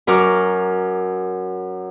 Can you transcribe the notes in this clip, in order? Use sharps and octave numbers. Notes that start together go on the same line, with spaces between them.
F#2 A#4 C#6 D6 F6